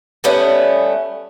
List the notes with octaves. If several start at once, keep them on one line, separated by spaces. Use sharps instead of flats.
G3 A3 B3 C#4